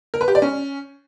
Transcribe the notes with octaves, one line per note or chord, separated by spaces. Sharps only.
A#4
B4
G4
D5
C#4